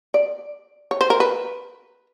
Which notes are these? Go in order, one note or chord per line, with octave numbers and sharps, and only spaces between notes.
D5
C#5
C5
A#4
B4